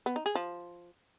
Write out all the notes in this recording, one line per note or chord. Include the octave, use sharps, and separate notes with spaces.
B3
D#4
G#4
F3